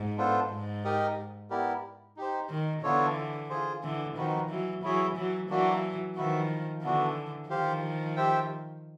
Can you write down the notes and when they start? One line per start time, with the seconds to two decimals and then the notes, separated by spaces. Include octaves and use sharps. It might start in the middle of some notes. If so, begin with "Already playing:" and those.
Already playing: G#2
0.17 B3 D4 F4 A4 C5
0.50 G#2
0.84 D#4 G4 A#4 D#5
1.50 B3 E4 G4 A#4 D5
2.17 D#4 G4 C5
2.50 D#3
2.83 D3 E3 B3 D4 F4 A4 C#5
3.49 F4 G#4 C5
3.83 D3 E3
4.16 D#3 F3 C4 D#4 F#4 B4
4.50 E3 F#3
4.83 E3 F#3 E4 G#4 C#5 E5
5.16 E3 F#3
5.50 E3 F#3 A#3 D4 F#4
6.16 D#3 F3 F#4 B4 E5
6.83 D3 E3 B3 D4 F#4
7.49 D#3 F3 G4 C5 F5
8.16 G4 C5 E5 G5